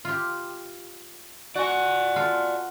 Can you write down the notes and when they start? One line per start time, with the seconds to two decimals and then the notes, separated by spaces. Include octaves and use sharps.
0.05 F4 G4
1.56 F#4 D5 G#5
2.16 F4 A4